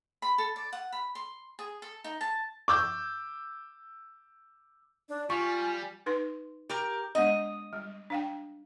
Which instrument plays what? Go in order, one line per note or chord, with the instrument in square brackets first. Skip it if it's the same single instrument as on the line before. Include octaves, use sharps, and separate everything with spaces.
[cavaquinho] B5
A4
D5
F#5
B5
C6
G#4
A4
D#4
A5
[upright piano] D6 E6 G6
[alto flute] D4
[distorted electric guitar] G3 [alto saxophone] F4 [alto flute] G#5 [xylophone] C#6
[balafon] D#4 B4 C6
[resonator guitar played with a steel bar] G4 A#4
[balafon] G#3 B3 D4 [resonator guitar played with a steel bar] D#5
[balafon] G3
D4 F5 G5